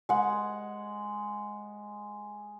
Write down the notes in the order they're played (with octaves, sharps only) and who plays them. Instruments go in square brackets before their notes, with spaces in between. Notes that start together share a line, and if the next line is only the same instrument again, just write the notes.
[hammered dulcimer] G#3 F#5